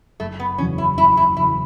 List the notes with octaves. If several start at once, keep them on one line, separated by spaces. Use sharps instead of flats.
F#1 A3
B3
E2 C#3 F#3 C#4
E4
F#1 E4
E4
E2 C#3 F#3 E4